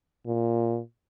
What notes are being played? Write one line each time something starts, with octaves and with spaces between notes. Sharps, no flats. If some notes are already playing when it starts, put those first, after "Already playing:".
A#2